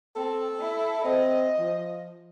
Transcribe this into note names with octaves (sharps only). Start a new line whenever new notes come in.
C4 A4
E4
C4 D#5
F3